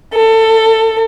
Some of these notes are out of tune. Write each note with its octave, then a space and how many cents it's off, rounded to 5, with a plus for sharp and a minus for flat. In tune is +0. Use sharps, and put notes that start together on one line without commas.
A4 +20